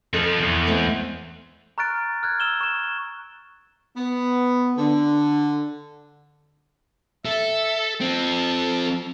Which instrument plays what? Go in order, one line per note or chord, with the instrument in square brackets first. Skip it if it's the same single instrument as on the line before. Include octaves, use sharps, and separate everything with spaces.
[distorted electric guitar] F2 F3 [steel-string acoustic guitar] G#4 A4
[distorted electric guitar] E2
[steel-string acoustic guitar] G#3 A3 C4
[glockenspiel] A#5 C#6 F6 F#6 A6 D7
F6 F#6 G#6
E6 E7 G7
C#6 E7
[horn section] B3
D3
[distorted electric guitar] A4 [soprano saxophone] E5
[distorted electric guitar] F3 C4 [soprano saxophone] A4